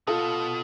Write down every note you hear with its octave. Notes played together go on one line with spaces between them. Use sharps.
B2 F4 A4